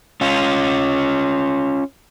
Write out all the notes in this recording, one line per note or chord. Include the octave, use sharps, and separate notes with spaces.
C#4 F4